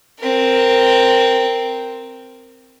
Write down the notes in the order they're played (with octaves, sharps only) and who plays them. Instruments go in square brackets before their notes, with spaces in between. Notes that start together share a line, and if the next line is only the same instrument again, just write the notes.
[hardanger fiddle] C4 A#4